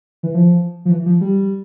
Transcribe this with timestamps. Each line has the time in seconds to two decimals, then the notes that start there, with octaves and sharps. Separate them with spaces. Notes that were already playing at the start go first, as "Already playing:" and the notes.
0.23 E3
0.35 F3
0.85 F3
0.91 E3
1.06 F3
1.21 G3